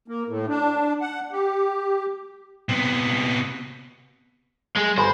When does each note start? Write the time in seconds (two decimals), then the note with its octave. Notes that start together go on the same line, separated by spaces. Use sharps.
0.08 A#3
0.28 A2
0.49 D4
1.01 F#5
1.32 G4
2.69 C3 B3
4.76 G#3
4.98 G1 B4 C5 G#5